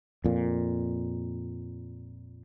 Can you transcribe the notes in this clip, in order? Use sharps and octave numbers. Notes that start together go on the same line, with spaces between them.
F2 A#2